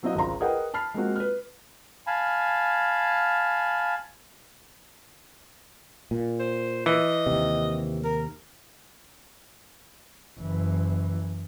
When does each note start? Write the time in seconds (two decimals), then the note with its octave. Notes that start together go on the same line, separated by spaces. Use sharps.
0.03 F#3 C4 E4 F#4 D#5 F5
0.15 G#1 C#2 C5 A#5 C6
0.41 G#4 A#4 B4 D#5 F#5 G5
0.74 A5 B5 F6 C7
0.94 G#3 A#3 C4 F#4
1.16 B4 F6
2.07 F5 G#5 A5 B5
6.11 A#2
6.40 C5
6.86 E3 D#5
7.26 D#2 C3
8.05 A#4
10.39 F#1 E3